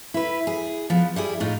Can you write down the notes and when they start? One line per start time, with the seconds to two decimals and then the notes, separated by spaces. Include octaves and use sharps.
0.14 E4 B4
0.47 G#4
0.90 F3 B3
1.16 G3 E4 G#4
1.40 A2 D#4 F4